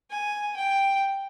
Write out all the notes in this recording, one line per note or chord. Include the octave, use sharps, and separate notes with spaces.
G#5
G5